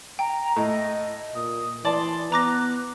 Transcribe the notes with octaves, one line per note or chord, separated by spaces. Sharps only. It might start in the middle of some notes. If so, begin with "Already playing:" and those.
G5 A#5
A2 D#5
A#2 D#6
E3 D5 A5 C6
B3 A#5 D6 F#6 A#6